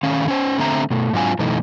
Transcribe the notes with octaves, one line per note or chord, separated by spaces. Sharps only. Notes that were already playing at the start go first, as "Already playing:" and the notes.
D#3 A3 C#4 F5
C#4 C5
D3 A3 B3 C4 E5 A#5
B2 A3
G#2 F#3 C4 D4 F4 G#5
F#2 B2 E3 A3 D#4